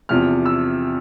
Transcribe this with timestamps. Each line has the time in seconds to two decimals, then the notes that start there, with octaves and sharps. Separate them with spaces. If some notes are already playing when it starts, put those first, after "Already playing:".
0.09 E2 C3 F3 F6
0.46 E6